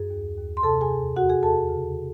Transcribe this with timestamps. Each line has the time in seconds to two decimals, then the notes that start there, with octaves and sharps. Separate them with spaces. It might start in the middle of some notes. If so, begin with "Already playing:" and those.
Already playing: F#2 G#4
0.10 D#2
0.37 D#2
0.57 C6
0.63 C3 A4 A5
0.81 G#4 G#5
0.90 E2
1.16 E2 F#4 F#5
1.29 G#4 G#5
1.42 E2 A4 A5
1.69 C#3